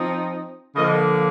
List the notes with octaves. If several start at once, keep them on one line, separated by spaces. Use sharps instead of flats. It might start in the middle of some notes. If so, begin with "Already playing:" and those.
Already playing: F3 C4 D#4
D3 F3 A#3 D#5